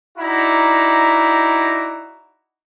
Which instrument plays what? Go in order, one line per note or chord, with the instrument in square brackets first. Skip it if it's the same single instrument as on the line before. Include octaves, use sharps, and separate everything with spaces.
[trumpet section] D#4 E4 F#4 D5 A#5